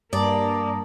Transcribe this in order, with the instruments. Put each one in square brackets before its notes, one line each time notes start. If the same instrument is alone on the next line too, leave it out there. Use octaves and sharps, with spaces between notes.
[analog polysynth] G2 [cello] A#3 [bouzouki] D5 [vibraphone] A5 A#5 D#6